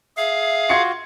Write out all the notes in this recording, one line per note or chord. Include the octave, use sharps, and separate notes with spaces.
G#4 E5 F5
F4 F#4 C6 G#6 C#7